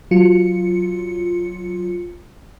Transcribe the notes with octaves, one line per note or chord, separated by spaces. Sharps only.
F#3 F4 C#7